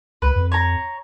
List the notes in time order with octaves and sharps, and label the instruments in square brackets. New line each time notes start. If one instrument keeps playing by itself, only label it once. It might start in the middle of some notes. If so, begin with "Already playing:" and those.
[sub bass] C#2 [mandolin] B4
[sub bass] F2
[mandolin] C#5 A#5